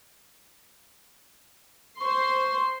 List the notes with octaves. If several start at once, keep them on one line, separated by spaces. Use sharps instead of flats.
C5 C6 C#6